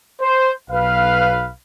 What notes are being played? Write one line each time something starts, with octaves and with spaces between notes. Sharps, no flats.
C5
B1 B4 F5